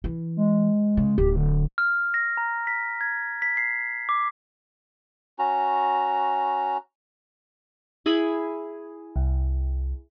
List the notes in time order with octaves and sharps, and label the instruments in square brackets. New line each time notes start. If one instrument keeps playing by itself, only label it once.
[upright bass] E3
[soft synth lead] G#3
[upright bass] C#3
[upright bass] D1 [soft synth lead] G4
[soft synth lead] D3
[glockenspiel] F6
A#6
A#5
B6
G#6
B6
C7
D6
[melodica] C#4 F#4 A#5
[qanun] E4 G#4 B5
[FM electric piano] C2